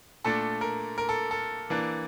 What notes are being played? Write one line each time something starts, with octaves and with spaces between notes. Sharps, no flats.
A#2 A3 D4 A4
A#4
A#4
A4
A4
E3 A#3 D4